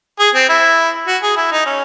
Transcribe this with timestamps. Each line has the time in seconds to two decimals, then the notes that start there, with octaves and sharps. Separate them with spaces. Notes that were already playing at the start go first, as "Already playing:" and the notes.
0.19 G#4
0.35 C4
0.49 E4
1.07 F#4
1.23 G#4
1.37 E4
1.52 D#4
1.66 C#4